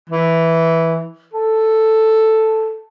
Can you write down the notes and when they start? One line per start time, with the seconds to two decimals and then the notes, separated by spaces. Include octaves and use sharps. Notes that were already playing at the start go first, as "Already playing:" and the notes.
0.09 E3
1.34 A4